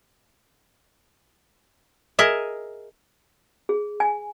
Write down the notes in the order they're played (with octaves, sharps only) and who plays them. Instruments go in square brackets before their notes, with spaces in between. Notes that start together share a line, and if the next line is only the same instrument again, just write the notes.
[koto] G#4 A#4 D#5 E5
[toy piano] G#4
G#5